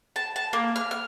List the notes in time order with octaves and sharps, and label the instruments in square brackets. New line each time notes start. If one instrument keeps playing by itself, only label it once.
[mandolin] A5
A5
A#3
F6
F6